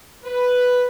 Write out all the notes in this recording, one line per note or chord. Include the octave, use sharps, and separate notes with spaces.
B4